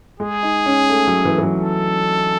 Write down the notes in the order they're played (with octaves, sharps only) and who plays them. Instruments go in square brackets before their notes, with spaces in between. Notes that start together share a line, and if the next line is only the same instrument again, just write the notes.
[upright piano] G#3 [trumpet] G#4
[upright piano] D#4
C#4
A3
F#3
E3
E3
F#3
[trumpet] A4